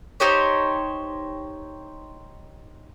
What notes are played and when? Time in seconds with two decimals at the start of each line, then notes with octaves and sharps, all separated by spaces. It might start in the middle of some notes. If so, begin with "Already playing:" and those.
0.20 D#4 G4 C5 C#5